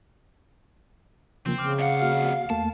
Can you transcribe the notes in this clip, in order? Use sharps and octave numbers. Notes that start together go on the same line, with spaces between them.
C#3 F3 A#3 C4
C#3 D6 F6
F2 F5 F#5
A#3 F#4 F6
E2 A3 A#3 A5